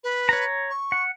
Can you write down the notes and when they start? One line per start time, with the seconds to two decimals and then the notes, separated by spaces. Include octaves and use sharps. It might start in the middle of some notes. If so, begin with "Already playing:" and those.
0.04 B4
0.29 C#5 A#5
0.70 C#6
0.92 F#5